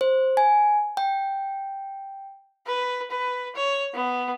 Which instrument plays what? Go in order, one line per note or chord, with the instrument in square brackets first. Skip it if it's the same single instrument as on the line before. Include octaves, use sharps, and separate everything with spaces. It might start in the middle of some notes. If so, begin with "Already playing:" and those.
[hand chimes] C5
G#5
G5
[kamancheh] B4
B4
C#5
B3